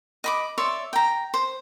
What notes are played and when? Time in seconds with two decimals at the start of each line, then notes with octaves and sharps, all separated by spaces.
0.24 D#5 B5 D6
0.58 C#5 D5 E5 C6
0.93 G5 A#5
1.34 C5